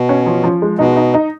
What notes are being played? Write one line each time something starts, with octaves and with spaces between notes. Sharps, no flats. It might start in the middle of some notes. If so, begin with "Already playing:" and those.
Already playing: B2
C#4
F3
F3
G#3
B2 D#4
D#4
D#4